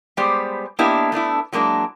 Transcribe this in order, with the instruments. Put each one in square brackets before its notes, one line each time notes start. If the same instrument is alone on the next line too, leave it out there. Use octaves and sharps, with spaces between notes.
[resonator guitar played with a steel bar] G3 G#3 B3 G4 C5 D5
A#3 B3 D4 E4 G4 D#5
A3 B3 D4 E4
F#3 G#3 A#3 D4 E4